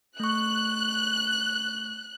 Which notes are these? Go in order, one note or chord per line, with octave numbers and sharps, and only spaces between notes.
A3 C#6 F#6